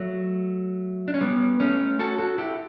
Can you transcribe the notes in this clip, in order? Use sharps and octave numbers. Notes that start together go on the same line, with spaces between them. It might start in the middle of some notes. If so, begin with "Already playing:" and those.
Already playing: F#3 A3
D4
C#4
G3 B3
A3 C#4
F#4 A4
F#4 A4
E4 G4